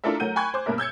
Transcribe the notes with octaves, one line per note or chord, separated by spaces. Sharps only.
D4 E4 F4 A4 A#4 E5
F#3 A3 A#4 F#5 G6 D#7
G5 G#5 B5 C#6 F#6 G#6
C5 D6
G2 B2 A#3 A#4 E5
E6 G6 G#6 C#7